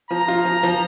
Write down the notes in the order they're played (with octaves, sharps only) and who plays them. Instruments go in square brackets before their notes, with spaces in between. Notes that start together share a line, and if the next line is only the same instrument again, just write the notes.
[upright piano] F3 [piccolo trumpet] A#5
[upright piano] F4
F3
F3